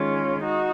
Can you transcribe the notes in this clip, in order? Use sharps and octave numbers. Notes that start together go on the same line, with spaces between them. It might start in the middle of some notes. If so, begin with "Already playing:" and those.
Already playing: D#3 G#3 C#4 F4
D#4 F#4